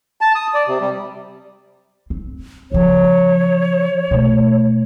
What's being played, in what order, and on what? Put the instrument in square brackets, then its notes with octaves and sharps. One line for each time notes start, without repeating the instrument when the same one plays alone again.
[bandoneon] A5
D#6
D5
C3
G3
[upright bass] C4
[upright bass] C#3 F3 [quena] C#5
[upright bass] B2 A3